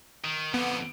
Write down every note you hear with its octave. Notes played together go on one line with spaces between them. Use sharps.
D#3
F2 D3 B3